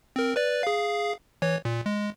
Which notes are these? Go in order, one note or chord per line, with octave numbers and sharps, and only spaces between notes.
C4 A#4
B4 D5
G#4 F5
E3 C#5
A#2
G#3